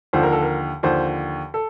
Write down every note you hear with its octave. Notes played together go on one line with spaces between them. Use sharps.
D#2 D3 F3 C5
A#4
A4
A#4
D#2 D3 F3 C5
A4